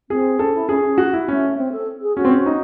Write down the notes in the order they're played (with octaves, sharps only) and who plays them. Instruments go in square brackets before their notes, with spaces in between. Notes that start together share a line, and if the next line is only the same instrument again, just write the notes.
[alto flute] C4 [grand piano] G#4
[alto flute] C#4 [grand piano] A4
[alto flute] E4
[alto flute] C#4 [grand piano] G#4
[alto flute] C#4
[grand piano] F#4
E4
[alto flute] A3 [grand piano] C#4
[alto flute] C4
A4
G#4
[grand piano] C#4 [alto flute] F#4
[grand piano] C4
C#4
[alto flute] F#4
[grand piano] D#4